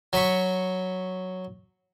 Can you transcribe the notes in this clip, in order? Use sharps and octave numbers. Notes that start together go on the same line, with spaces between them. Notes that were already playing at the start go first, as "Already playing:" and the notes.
F#3 B5 C#6